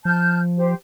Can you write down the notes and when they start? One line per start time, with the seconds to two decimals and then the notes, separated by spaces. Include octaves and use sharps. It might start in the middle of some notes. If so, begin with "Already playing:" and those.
0.05 F3 A5 F6 G6
0.58 G4 C5